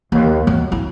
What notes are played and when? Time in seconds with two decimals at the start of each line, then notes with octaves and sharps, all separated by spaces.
0.12 D#2
0.47 F#3
0.72 E4